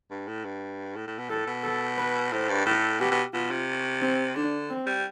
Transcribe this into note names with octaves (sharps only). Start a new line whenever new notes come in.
G2
A2
G2
A2
A2
B2
A2 A4
B2
A4
B4
A2 C5
G2
A2 A4
B2 G4
B2
B2 F4
C3
C4
D3 D4
C4
G3